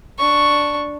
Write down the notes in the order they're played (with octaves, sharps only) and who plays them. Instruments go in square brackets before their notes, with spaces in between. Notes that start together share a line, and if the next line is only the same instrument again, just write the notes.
[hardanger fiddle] D4 C#6